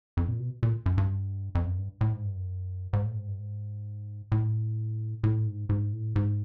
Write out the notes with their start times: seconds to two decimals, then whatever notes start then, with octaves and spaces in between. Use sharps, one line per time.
0.17 F2
0.28 A#2
0.40 B2
0.63 A#2
0.86 F#2
0.98 G2
1.55 F2
1.66 F#2
1.78 G2
2.01 A2
2.13 G#2
2.25 G2
2.36 F#2
2.93 G#2
3.05 A2
3.16 G#2
3.27 G2
3.39 G#2
4.32 A2
5.24 A2
5.47 G#2
5.69 G#2
5.93 A2
6.16 G#2